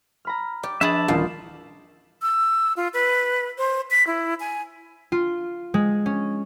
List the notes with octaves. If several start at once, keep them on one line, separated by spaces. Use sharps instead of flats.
A#5 B5 F6
G4 D5
F3 D4 G#4 B4 E5 A5 B5 F#7
D#1 A#2 E3 G3 D#4 F4 G5 C7
E6
F4
B4
C5
B6
E4
G#5
F4
G#3
C#4